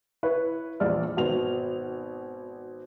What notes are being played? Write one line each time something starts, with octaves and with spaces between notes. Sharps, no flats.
E4 B4 C#5
A#1 E2 D5 F6
G#1 B2 F7